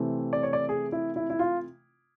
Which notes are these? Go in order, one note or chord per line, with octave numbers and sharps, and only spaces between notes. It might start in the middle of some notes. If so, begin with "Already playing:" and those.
Already playing: C3 E3 A3 C4
D5
C#5
D5
G#4
E4
E4
E4
F4